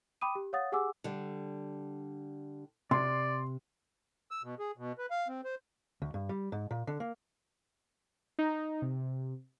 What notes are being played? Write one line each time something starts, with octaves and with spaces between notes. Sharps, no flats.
G5 B5 D6 D#6 D#7
G4
C#5 F5 F#5 D#6 A6
G4 G#4 F#5 G#5 D6 E6
D3 G3
C3 D5 C6
E6
B2
G#4
B2
B4
F5
C4
C5
D2
G2
G3
G#2
A#2
D3
A#3
D#4
C3